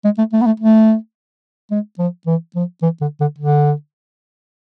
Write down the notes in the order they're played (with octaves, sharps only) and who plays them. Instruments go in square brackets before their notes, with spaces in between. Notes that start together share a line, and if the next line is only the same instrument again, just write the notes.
[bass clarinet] G#3
A3
A3
B3
A3
A3
G#3
F3
E3
F3
E3
D3
D3
D3